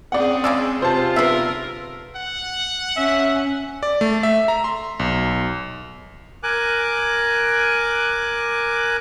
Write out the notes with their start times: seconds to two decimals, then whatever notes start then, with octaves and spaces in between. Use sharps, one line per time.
0.12 C4 C#4 G#4 D5 F#5
0.44 C#3 G#3 D5 E6
0.82 C3 F4 C5 A5
1.16 B3 D4 A#4 E5
2.16 F#5
2.97 C#4 E5
3.83 D5
4.01 A3
4.23 E5
4.48 A#5
4.64 C6
4.99 B1
6.43 A#4 G#5 D6 F#6